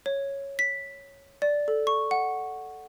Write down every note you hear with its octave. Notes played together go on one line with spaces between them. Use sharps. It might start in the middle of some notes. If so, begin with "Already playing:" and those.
C#5
B6
D5
A4
C#6
F#5